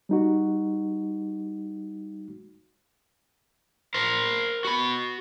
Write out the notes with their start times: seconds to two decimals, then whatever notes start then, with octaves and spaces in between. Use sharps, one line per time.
0.09 G3 D#4 F#4
3.94 A#4 C5
4.65 F#4 B5